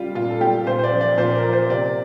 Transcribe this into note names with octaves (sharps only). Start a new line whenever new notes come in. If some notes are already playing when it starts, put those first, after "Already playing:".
Already playing: G3 F4
A#2 F4
A4
G3 G4
A#2 C5
C5
D5
F3
D5
A#2 C5
A#4
F3
C5
C3 D5